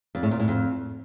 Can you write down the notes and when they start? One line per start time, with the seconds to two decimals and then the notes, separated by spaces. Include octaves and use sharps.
0.15 F2
0.23 A2
0.31 A#2
0.40 A2
0.48 F2